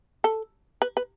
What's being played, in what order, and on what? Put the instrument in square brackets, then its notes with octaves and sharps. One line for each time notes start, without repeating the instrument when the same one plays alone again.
[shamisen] A4
B4
B4